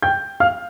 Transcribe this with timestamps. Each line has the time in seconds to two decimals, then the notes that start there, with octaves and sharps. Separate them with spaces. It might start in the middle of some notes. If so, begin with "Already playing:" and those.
0.02 G5 G6
0.40 F5 F6